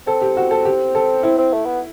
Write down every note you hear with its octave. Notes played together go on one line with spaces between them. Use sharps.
C4 A4
G4
F#4
A4
G4
A4
C4 E4
C4
A3
B3